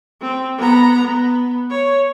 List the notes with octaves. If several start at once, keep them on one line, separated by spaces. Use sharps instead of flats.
C4
B3 A#5
B3
C#5